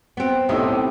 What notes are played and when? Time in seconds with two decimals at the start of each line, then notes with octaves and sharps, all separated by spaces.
0.17 B3 C4
0.49 B1 A2 C3 D#4 E5